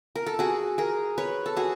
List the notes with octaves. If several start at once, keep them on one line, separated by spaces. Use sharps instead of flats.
A#4
A4
F#4 G#4
G#4 A#4
B4 C#5
A4
F#4 G#4